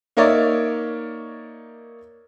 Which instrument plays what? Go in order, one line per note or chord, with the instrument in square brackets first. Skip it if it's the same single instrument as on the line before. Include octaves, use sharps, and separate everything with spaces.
[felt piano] A#3 D#4 A#4 C#5 D5 E5